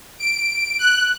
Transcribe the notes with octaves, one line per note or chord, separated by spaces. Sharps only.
D7
F#6